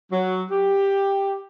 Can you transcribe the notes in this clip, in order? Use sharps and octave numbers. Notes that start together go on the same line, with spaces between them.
F#3
G4